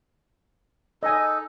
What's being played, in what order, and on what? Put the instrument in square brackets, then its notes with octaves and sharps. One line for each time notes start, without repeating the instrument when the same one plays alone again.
[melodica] D#4 A4 [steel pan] D#5 G#5